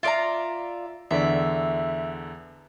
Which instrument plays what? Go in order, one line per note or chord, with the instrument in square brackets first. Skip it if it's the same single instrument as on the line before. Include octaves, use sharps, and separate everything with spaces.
[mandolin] F4 D5 A#5 [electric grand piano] E5 D7
[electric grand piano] E2 D3 D5 [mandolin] E5